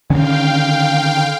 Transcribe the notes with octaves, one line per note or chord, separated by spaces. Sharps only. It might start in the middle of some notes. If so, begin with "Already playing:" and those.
D3 D#3 C#4 F5 G5